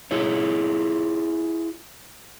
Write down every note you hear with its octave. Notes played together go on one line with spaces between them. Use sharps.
E4 F4 G#4 C#5